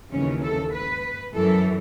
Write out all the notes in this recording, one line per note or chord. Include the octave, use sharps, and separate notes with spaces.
D#2 C#3 E3 C#4
A4
B4
F#2 E3 A4